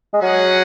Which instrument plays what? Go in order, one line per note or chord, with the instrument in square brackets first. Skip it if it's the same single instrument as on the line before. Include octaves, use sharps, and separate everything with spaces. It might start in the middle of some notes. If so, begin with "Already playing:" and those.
[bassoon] G#3
[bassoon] F#3 [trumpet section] C#4 G#4 D#5 F#5